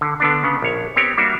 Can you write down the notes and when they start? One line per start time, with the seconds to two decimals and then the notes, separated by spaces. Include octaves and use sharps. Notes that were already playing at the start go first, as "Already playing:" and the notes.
0.01 D3
0.20 D3 B3 D4
0.44 C#3 B3
0.62 A#1 C#5
0.96 B3 C4 G4 C#5
1.18 G3 A#3 D4 F#4 E5